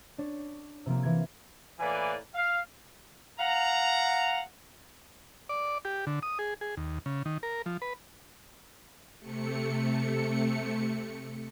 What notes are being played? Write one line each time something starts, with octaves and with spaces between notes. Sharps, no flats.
D4 C#5
C3 F3 A#3
E3 G#6
A2 E3 A#3 B4 D5 G#5
F5
F5 F#5 A#5
D5
G4
D3
D#6
G#4
G#4
D#2
C#3
D#3
A#4
F3
B4
C3 A3 C#7